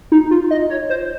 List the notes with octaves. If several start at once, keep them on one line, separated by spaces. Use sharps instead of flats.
D#4
F4
D#5
C#5
C5